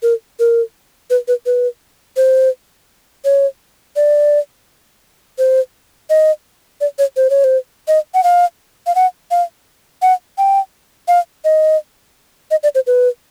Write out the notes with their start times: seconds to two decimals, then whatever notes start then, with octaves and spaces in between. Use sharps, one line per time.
0.03 A#4
0.39 A#4
1.10 B4
1.28 B4
1.46 B4
2.17 C5
3.25 C#5
3.96 D5
5.38 C5
6.10 D#5
6.81 D5
6.99 C#5
7.16 C5
7.30 C#5
7.44 C5
7.88 D#5
8.14 F#5
8.24 F5
8.87 F5
8.95 F#5
9.31 F5
10.02 F#5
10.38 G5
11.08 F5
11.44 D#5
12.51 D#5
12.63 D5
12.75 C5
12.87 B4